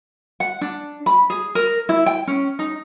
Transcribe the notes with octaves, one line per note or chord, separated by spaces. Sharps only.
F#5
D4
B5
G#4
A#4
E4
G5
C#4
D#4